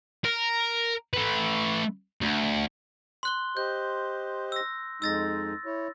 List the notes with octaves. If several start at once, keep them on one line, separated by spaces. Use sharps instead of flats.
A#4
A3 B4
D2
C6 F#6 G7
G4 C5 D#5 G6
E6 A#6
F2 G#3 D#4 E6 A6 A#6
E4 C#5